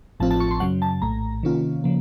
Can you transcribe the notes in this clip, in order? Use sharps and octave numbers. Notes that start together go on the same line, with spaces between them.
A1 A2 F3 C4 F4 A5
A5
C#6
C6
F#2 C#3 F#3 F#5
A5
A#1 A2 A3 A#5
C3 D#3 A#3 C#4 F4
C#3 F3 A#3